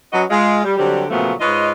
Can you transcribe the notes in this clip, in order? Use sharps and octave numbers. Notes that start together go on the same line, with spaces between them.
F#3 C#4 F#4 B4 D#5
G#3 F4
G3
D3 F#3 G3 C4 G4
A#2 C#3 F3 F#3 A3 B3
G#2 F4 B4 C#5 D#5